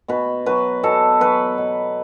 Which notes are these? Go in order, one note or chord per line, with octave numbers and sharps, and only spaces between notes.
B2 B4
F#3 B4
B2 A4
F#3 B4
B2